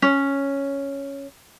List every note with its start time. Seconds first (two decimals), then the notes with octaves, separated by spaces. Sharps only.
0.02 C#4